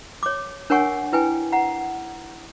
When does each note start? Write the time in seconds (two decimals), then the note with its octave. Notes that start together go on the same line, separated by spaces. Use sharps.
0.23 C#5 D6
0.70 D4 A#4 C#5 F#5 G#5 C#6
1.13 E4 B4 G5 G#5
1.52 F#5 A#5